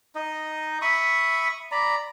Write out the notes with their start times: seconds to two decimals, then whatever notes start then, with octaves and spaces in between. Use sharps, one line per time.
0.15 D#4 D#5
0.82 E5 B5 C#6 D#6
1.72 D5 A#5 B5